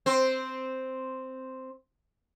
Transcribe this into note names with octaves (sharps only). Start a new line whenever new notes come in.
C4 C5